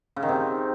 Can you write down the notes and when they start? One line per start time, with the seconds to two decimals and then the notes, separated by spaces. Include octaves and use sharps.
0.16 C#3
0.23 D#3
0.29 C3